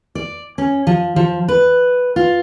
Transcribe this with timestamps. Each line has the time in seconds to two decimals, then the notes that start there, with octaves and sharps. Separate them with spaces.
0.15 D5
0.58 C#4
0.87 F3
1.16 F3
1.48 B4
2.16 F4